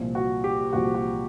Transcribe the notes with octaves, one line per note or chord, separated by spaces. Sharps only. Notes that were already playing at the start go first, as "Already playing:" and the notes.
Already playing: C2 A#2 F3
F#4
G4
C2 A#2 F3 F#4
F#4